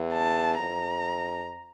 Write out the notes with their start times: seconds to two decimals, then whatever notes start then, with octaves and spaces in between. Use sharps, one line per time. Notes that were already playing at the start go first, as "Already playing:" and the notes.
Already playing: E2
0.13 A5
0.59 F2 A#5